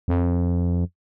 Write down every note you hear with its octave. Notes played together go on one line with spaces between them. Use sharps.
F2